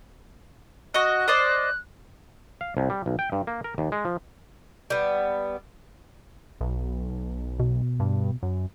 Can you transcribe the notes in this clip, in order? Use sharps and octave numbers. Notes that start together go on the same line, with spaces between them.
F#4 D#5 F#6
C5 D5 D#5
F5
C2
G3
B1
G5
G2
A#3
A#4
D#2
G#3
F3
G3 B3
B1
B2
G2
F#2